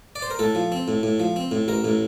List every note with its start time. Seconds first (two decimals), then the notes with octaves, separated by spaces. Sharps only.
0.16 D5
0.22 C5
0.31 A#4
0.39 A2 A4
0.55 F3
0.72 C4
0.88 A2
1.03 A2
1.20 F3
1.36 C4
1.51 A2
1.68 A1 A#4
1.84 A2